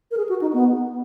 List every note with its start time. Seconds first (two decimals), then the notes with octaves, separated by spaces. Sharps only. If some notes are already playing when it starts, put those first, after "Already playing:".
0.11 A#4
0.17 G#4
0.29 F#4
0.41 D#4
0.53 B3